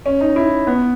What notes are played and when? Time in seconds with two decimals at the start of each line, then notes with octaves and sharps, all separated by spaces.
0.06 C#4
0.21 D#4
0.36 E4
0.67 B3